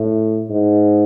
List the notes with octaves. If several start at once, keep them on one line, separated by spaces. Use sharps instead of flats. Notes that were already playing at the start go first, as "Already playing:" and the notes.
Already playing: A2
G#2